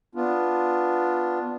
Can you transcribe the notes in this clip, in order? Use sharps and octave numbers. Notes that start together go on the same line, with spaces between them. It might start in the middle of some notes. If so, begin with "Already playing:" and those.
B3 D4 F4